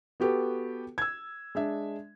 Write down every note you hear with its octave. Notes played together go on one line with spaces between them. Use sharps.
B3 F#4 G4 A4 B4
E6 G#6
G#3 D4 E5